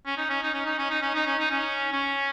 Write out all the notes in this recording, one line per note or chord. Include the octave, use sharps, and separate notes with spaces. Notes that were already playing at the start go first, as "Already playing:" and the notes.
C#4
D#4
C#4
D#4
C#4
D#4
C#4
D#4
C#4
D#4
C#4
D#4
C#4
C#4